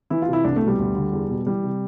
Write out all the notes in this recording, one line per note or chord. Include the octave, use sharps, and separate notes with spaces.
E3 E4
F4
C3
E4
C2 D4
A3
B2
G3
D2
D3
E2
B2
E3 G3
C3